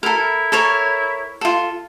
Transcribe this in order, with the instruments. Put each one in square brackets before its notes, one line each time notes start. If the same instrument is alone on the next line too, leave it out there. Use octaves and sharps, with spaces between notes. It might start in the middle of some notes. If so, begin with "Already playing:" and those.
[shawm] E4 [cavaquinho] A4 A#4
[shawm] E4
[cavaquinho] A4 A#4 C#5
F4 A4